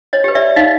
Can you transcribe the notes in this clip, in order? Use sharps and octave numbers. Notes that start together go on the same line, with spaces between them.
C#5 D#5
G4 B4
D5 E5
D#4 D#5 F5